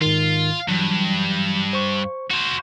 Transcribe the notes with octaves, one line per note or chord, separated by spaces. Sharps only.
G#2 D#3 F4
G2 E3 F#3
C5 C#6
F#4 C5